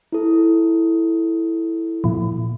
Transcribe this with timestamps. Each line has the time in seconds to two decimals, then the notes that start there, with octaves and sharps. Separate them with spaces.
0.12 E4 A4
2.04 A#2 F3